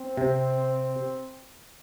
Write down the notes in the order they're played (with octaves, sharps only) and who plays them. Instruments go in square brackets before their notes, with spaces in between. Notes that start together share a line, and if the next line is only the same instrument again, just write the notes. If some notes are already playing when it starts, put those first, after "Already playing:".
Already playing: [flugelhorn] C4
[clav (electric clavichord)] C3